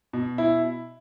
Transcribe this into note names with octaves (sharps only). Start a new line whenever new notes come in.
B2
E4